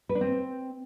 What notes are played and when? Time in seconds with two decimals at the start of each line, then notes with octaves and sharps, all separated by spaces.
0.09 B4
0.15 D4
0.21 C4